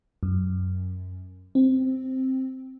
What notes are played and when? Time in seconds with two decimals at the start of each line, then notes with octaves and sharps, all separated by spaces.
0.23 F#2
1.55 C4